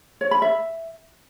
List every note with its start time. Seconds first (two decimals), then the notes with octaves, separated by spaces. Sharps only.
0.21 C#5
0.31 B5
0.42 E5